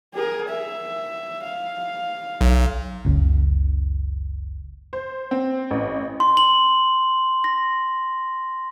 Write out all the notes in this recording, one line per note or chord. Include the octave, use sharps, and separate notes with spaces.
G#4 A#4
E5
F5
B1
F#1 C#2
C5
C4
A1
C6
F#7
A#6